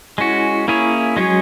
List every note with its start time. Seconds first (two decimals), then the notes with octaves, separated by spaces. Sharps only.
0.18 G#3 C#4 E4 F#4
0.68 A#3 C#4 E4 G#4 C#5
1.17 F#3 G#3 C#4 F#4 G#4 C#5